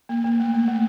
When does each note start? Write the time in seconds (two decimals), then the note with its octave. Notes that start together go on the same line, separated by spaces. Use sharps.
0.09 A#3
0.24 A#3
0.40 A3
0.54 A#3
0.68 A3